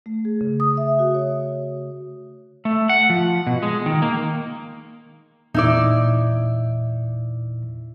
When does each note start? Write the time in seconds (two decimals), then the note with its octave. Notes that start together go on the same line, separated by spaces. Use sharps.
0.06 A3
0.25 G#4
0.41 C#3
0.60 D#6
0.77 E5
0.99 F#4
1.15 C#5
2.65 A3
2.89 F#5
3.10 F3
3.47 B2
3.63 G#3
3.86 D#3
4.02 A#3
5.54 E2 A#2 D#4 E4 D5